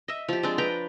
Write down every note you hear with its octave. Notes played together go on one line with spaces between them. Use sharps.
D#5 E5
F3 G4
G#3 C4 D4
B4 G5 A#5 C6